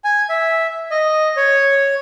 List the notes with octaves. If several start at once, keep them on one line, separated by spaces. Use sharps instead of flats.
G#5
E5
D#5
C#5